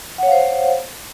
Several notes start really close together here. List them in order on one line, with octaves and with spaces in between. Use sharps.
F#5 C#5 F5 C5